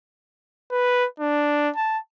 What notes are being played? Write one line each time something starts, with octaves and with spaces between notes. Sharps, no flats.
B4
D4
A5